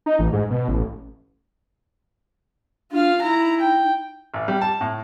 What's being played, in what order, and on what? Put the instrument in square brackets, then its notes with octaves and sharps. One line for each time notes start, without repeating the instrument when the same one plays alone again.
[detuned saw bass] D#4
A1
G#2
B2
A1
[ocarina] D4 [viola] F4 F5
[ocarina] D#4 [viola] E4 A#5
[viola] G5
[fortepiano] A1
G3
A5
A2